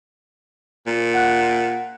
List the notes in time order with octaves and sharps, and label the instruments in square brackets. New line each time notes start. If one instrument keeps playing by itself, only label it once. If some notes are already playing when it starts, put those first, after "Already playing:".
[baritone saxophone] A#2
[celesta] F#5 F#6